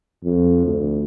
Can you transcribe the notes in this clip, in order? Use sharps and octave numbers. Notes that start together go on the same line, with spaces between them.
F2
D2